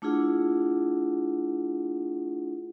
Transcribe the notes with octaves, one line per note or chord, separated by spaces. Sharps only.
A3 D4 E4 F4 G#4 F#5